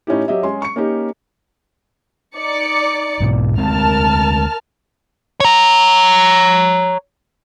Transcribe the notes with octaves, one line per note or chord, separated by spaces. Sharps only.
A2 C#4 D#4 E4 G4
F#3 G4 D#5 E5
G#3 C#4 G#4 C6
C#6 C#7
A#3 C#4 D#4 G4
D#4 D5 C#7
B1 G#2 B2
D2 G#3 C4 A#4 A5 F6
C#5 A#5